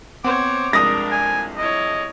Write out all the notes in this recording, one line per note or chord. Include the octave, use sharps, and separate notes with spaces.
B3 C4 C5 C#5 F#5 D6
C2 F2 G#3 D4 A#4 D#6 A#6
G#5
E4 C#5 D#5